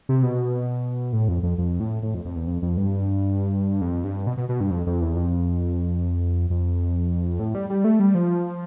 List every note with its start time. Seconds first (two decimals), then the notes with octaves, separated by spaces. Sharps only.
0.09 C3
0.23 B2
1.13 A2
1.28 F2
1.43 F2
1.58 F2
1.80 A2
2.03 A2
2.14 F2
2.25 F2
2.36 E2
2.47 F2
2.62 F2
2.77 G2
3.81 F2
4.04 G2
4.27 B2
4.37 B2
4.49 B2
4.61 G2
4.71 F2
4.87 F2
5.01 E2
5.16 F2
6.50 F2
7.39 A2
7.55 G3
7.70 G3
7.84 A3
7.99 G3
8.15 F3